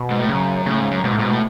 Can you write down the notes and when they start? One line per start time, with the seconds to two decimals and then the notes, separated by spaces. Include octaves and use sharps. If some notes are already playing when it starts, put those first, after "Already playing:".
Already playing: B2
0.10 G#2
0.19 A2
0.29 F#2 C#3
0.66 A2 C#3
0.79 G#2
0.91 F#2
1.04 G#2 B2
1.13 A2
1.19 G#2 B2
1.30 A2